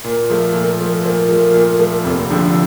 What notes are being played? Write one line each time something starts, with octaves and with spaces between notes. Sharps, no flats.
A#2 A#4
F3 A3
A#2
F3 A3
A4
A#2 A#4 C5
F3 A3
A#2
F3 A3
F1 C4
A#3
F2 D3 F3 A3 D4
C4